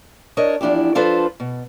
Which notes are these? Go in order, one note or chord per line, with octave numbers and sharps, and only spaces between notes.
D4 A#4 C#5 D#5
E2 F3 D4 E4 G4
F3 D4 F4 A4 B4 C5
B2